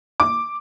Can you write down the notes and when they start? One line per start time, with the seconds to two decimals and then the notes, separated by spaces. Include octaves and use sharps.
0.20 D6